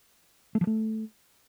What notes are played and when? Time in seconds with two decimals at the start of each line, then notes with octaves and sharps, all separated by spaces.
0.55 A3
0.61 F3
0.67 A3